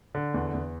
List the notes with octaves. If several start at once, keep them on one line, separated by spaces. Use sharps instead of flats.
D3
E2
E2